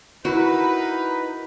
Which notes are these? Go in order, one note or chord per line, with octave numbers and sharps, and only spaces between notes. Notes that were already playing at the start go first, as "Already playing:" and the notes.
D#4 E4 F#4 A#4 B4